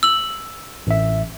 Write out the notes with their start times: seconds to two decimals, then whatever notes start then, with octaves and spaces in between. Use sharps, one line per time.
0.03 E6 F#7
0.87 A1 E5